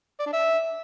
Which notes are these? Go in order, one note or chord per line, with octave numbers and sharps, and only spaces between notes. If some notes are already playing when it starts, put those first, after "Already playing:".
D5
D4
E5